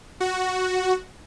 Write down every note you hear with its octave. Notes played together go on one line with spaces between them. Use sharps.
F#4